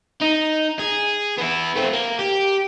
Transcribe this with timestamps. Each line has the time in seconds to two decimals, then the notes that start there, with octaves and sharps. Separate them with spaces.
0.22 D#4
0.79 G#4
1.38 B3 E4
1.76 A3 C4
1.93 A#3
2.19 G4